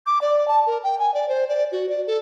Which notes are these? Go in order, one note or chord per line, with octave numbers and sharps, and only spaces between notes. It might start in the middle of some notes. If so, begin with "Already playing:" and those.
D6
D5
A5
A#4
G5
G#5
D5
C5
D5
F#4
D5
A4